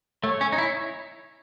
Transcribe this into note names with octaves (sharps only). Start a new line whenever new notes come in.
A3 C#5
C#4
D#4
E4